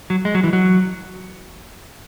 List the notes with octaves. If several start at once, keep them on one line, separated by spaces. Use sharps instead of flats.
F#3
G#3
F#3
E3
F#3